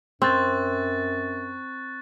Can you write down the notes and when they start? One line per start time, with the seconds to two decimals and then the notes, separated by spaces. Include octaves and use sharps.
0.22 F#2 C4 C#6 F#6 A6